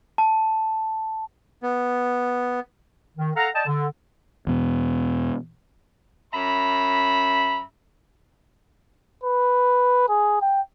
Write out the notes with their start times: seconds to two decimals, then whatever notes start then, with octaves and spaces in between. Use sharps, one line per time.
0.18 A5
1.63 B3
3.17 D#3
3.35 A4 F5 F#5 A#5
3.54 D5 D#5 G5 A5
3.66 D3
4.47 E2 B2
6.33 F#2 E5 A#5 B5
9.24 B4
10.09 G#4
10.42 G5